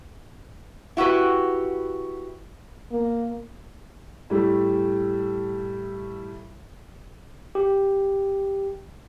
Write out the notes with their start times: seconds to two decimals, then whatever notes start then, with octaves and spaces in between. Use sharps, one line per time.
0.97 E4 F#4 G4 B4
2.92 A#3
4.30 A2 G3 A3
7.55 G4